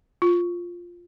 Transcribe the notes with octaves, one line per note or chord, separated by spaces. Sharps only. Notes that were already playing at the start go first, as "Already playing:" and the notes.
F4